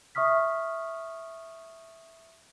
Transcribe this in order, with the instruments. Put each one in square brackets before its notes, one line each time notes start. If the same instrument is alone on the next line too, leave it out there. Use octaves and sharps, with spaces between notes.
[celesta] E5 C#6 D#6 F6 B6